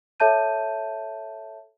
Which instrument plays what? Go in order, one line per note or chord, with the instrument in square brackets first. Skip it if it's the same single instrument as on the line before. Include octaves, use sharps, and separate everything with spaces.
[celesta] A4 C#5 E5 A5 G6 D#7